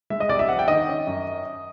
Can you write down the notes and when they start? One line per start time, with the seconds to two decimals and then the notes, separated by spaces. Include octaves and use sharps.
0.10 G#3 E5
0.20 D#5
0.29 C2 D5
0.39 E5
0.49 F3 F#5
0.59 G5
0.68 D#3 D#5
0.88 C#4
1.07 F#2